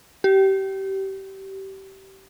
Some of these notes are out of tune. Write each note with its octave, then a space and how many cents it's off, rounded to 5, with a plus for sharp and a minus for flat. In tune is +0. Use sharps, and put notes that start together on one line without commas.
G4 -25